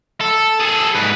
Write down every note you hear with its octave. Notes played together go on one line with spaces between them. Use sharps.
A4
G#4 A4
G#2 B4